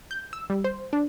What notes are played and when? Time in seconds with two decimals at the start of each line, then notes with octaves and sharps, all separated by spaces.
0.11 G6
0.33 E6
0.50 G3
0.64 C5
0.93 D4